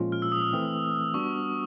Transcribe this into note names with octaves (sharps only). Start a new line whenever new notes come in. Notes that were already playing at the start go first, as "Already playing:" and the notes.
Already playing: A#2 F3 G#3 C#4 F4
F6
E6
D#6
D#6
E3 A3 C4
G3 B3 D4 F#4 C#6